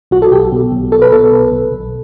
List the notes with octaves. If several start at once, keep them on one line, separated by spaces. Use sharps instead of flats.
B1 F#4
A4
B1 G4
B2
B1
B1 A4
B4
B2 A4
B1
B1
B1